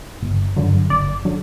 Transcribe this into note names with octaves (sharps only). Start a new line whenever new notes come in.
G1
G2 D3 F#3
G1 D5
D3 F#3